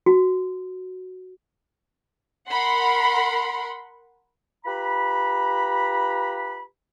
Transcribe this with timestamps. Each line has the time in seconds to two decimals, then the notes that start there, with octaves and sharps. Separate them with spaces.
0.06 F#4
2.48 A#4 F#5 B5 C6
4.65 F4 G4 B4 A#5 B5